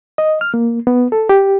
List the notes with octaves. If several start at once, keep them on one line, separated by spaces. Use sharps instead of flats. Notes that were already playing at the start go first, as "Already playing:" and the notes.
D#5
F6
A#3
B3
A4
G4